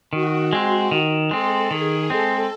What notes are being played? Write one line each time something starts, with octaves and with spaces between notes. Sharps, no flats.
D#3 F#4
G#3 C4
D#3
G#3 C4 A4
D#3 G#4
G#3 C4 A4